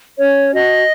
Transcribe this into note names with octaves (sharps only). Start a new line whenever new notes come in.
C#4 C#5
F#4 D#5